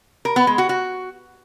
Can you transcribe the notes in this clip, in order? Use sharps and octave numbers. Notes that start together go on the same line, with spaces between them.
A#4
B3
G#3
F#4
F#4